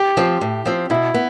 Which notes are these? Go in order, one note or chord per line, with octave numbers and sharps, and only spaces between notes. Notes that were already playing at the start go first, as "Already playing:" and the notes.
Already playing: G4
F3 C4
A2
F3 C4
B2 E4
B3